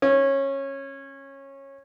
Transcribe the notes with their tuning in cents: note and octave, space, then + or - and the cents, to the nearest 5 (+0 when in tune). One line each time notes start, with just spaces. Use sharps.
C#4 -20